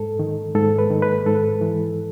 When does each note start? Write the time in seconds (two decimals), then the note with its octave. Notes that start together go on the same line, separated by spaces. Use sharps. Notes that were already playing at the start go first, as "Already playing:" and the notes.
Already playing: G#2 A4
0.19 D#3
0.55 G#2 A4
0.78 B4
0.90 D#3
1.02 B4
1.26 G#2 A4
1.61 E3